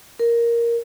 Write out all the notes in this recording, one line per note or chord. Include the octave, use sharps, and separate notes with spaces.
A#4